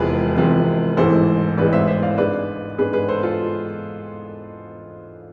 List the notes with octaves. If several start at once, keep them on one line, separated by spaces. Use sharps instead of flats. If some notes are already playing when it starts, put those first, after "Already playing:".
Already playing: E1 E2 C3 F3 G#3 G#4 B4
E1 E2 C3 F3 G#3
A1 G#2 E3 G#3 A4 C5
A1 G#2 E3 G#3 B4 D5
C5 E5
C5 E5
D5 F5
G#2 G#3 D4 B4 D5
G#2 G#3 D4 G#4 B4
G#4 B4
A4 C5
F4 A4